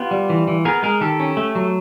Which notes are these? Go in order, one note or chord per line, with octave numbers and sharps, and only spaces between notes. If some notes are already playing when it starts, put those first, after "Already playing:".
Already playing: B3 F4 G4
G3
E3
E3
B3 G#4 A#4
G#3 G#4 A#4
D#3 G4 A4
C#4
A3
F#3